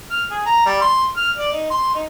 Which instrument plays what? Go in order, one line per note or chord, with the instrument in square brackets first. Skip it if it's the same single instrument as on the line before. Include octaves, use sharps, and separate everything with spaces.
[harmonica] F6
G#4
A#5
G3
C6
F6
D5
D#4
C6
D#4